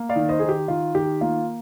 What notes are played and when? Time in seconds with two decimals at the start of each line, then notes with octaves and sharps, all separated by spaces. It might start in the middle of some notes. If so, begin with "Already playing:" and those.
Already playing: A#3
0.09 D5 F5
0.16 D#3
0.29 C5 D#5
0.39 D#3 G#4
0.49 G4
0.68 D#3 F4
0.95 D#3 G4
1.21 A#3 F4